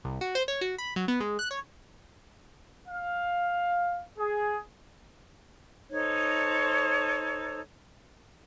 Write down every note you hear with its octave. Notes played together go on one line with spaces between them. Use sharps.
C2
F#4
C5
C#5
F#4
B5
F#3
B3
G#3
F#6
C#5
F5
G#4
D#4 A4 C5 C#5